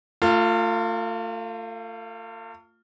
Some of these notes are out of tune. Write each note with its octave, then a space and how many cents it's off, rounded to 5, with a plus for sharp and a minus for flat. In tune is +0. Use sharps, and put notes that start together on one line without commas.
A3 +40 F4 +0